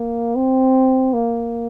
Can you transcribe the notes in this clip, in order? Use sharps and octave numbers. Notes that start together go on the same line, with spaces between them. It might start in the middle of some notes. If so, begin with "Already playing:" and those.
Already playing: A#3
C4
A#3